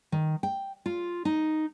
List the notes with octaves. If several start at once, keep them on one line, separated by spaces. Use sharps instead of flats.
D#3
G5
F4
D#4